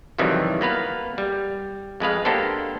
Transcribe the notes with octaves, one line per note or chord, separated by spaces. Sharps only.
F2 C3 D#3 E3 F#3 G3
A#3 B3 B4 F5
G3
F2 G#3 B4 F5
A#3 B3 D4 G4 A4 C5